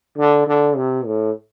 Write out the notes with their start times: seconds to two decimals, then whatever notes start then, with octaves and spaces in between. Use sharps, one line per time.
0.18 D3
0.47 D3
0.76 C3
1.05 A2